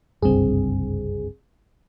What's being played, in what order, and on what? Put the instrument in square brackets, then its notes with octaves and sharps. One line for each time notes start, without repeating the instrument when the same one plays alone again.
[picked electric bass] F#1 C2 G2 [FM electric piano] C4 G#4